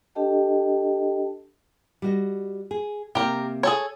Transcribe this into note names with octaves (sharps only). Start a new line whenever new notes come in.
D4 G4 A4 D#5 G5 A5
G3 F#4 D#5
G#4
C3 A#3 G4 A#4
G#4 A4 C#5